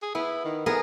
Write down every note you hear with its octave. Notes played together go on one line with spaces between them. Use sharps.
G#4
B3 E4
D#3
A2 B3 G#4 A#4